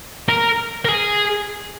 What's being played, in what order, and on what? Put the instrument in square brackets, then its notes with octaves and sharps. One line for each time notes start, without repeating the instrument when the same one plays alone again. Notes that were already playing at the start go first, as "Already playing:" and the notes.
[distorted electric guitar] A#4
A#4
G#4